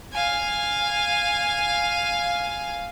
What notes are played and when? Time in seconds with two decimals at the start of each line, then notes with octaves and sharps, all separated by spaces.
0.13 F5 G#5